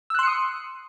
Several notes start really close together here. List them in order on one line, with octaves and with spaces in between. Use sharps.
E6 F#6 C6 C#7 D#6